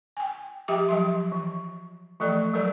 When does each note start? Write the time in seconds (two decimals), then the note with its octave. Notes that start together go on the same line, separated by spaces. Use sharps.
0.17 G5 G#5
0.68 F3 G4 E5 G5 D6
0.89 F3 F#3 E5 C6
1.32 E3
2.20 E3 F3 A3 A4 D5
2.54 F#3 G3 A4 A#4 C#5 D5